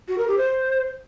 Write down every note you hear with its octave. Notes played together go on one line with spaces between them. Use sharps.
F#4
A#4
G4
C5